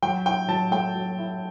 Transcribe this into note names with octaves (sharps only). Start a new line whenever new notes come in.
F#3 G5
E4 G5
F#3 A5
A3 G5
F#3
E4